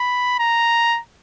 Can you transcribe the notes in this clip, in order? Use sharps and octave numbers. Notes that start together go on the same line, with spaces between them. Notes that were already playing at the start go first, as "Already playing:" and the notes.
Already playing: B5
A#5